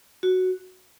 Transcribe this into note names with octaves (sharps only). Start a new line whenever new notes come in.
F#4